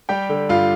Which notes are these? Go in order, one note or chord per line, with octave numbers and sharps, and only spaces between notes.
G3 G4 G5
D3
G2 F4 F5